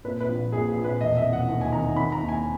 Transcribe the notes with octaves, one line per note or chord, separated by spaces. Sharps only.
A#2 B4
B4
A#1
A#2 G#4
G#4
A#1
B4
E1 D#5
E5
E1
F#5
D#2
G#5
D#3 A#5
D#3 B5
A#5
D#2
G#5